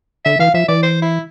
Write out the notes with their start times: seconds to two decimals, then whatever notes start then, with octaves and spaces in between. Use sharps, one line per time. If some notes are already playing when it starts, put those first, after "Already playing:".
0.25 D3 E5
0.39 E3 F5
0.54 F3 E5
0.68 E3 D5
0.83 C5
1.02 E4